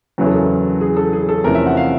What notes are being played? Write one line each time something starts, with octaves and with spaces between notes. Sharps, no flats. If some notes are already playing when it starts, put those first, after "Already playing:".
E2 C#3 F#3 B3 E4 B4
A4
A#4
G#4
A4
G#4
A4
E2 C3 F3 A3 C#4 A#4
E5
F#5
F5